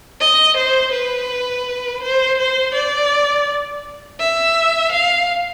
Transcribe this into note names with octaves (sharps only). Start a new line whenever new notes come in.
D#5
C5
B4
C5
C5
D5
E5
F5